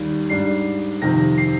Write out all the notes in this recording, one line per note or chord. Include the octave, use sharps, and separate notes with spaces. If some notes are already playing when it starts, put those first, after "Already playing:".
Already playing: D#2 D#3 G3
G#2 G3 D4 C7
F2 C3 D#3 A#6
C7